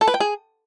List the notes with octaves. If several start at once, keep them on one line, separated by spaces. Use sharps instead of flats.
A4
B4
G5
G#4